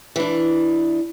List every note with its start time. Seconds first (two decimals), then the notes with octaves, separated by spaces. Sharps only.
0.16 E3 D4